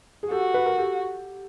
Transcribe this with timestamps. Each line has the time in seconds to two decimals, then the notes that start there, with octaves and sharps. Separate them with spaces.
0.23 G#4
0.31 F#4 G4 A4
0.54 B4
0.66 A#4
0.78 G4 A4